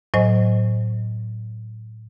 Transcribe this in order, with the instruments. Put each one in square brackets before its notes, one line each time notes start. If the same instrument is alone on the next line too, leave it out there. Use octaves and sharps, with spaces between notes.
[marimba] A2 F#3 C5 D#5 G#5